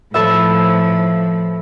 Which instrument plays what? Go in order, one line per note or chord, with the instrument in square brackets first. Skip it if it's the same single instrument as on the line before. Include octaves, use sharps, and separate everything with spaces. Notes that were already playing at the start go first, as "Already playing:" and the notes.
[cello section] A2 F3 [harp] A4 B4 E5